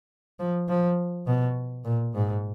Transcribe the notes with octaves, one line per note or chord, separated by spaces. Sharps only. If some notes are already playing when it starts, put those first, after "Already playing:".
F3
F3
B2
A#2
G#2